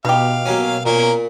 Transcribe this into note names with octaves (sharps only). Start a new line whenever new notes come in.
B2 D#4 G4 F5
F#3 A#3 C#4
A#2 A#3 C#4 A#4